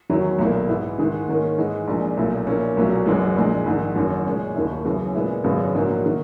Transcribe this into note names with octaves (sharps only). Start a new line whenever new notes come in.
E2 D#3 F#3 C#4 E4
B1 A#2 A#3 E4
G#2 E3 B3 E4
G#2 D#3 G#3
G#2 D#3 A#3 C#4
G#2 E3 G#3 D#4
A#1 A#2 G#3 D#4
B1 A#2 A#3 E4
A#1 A#2 A#3 C#4 E4
B1 A#2 F#3 C#4
F#1 F#2 E3 G#3
A#1 A#2 G#3
A#1 G#2 D#3
F#1 F#2 D#3
A#2 G#3 C#4
D#2 D#3 A#3 E4
F#2 C#3 E3 B3
A#2 G#3 B3 E4
G#1 F#2 C#3 G#3 B3
A#1 G#2 F#3 A#3 E4
D#3 A#3